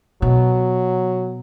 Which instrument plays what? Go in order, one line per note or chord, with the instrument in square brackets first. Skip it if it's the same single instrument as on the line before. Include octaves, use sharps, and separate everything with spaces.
[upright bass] B2 [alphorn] F#3